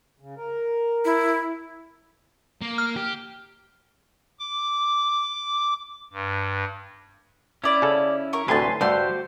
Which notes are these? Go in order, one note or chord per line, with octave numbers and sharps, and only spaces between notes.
C#3
A#4
E4
A#3
F6
G4
D6
G2
C#4 E4 D5 B5
C#3 A4
A#4 C#6
D2 A2 C3 B4 G#5 A5 C6
G2 D3 A3 F#4 G4 C5 C6